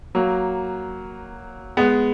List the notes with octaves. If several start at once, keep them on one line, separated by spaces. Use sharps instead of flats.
F#3 A#3
G#3 B3